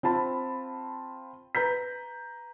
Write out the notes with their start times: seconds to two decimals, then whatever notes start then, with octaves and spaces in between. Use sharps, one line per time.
0.03 C4 F4 A5 B5
1.55 B4 A#5 G6 B6